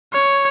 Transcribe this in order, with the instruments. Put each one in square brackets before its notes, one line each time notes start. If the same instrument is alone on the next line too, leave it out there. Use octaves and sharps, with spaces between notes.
[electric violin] C#5